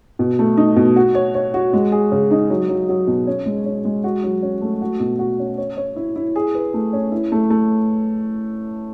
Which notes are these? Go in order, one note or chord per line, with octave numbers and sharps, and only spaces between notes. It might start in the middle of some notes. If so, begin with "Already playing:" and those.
B2
A3
D#4
B2
F#4
C#5
C#5
F#4
G#3
G#4
C#3
D#4
F#3
F#3
F#3
B2
C#4
G#3
C#4
G#3
F#4
F#3
C#4
A3
F#4
B2
F#4
C#4
C#5
C#5
E4
E4
G#4
B4
A3
C#4
E4
A3
A3